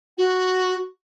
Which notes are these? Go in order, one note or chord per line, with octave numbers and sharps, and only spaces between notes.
F#4